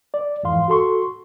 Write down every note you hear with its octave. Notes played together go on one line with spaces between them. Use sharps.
D5
F2 G#2 E3 F5 C6
F#4 A4 C6 C#6